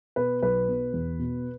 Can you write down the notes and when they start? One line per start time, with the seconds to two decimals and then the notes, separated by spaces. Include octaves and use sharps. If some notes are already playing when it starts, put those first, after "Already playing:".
0.16 B2 B4
0.42 B1 B4
0.68 B2
0.93 E2
1.19 B2